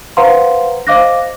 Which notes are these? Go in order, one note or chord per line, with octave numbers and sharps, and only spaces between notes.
B4 C5 F5 F#5 A#5 C6
C5 D#5 F5 D6 F#6 A#6